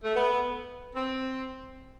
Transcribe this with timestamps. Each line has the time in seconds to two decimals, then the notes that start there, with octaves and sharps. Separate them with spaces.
0.04 A3
0.16 B3
0.96 C4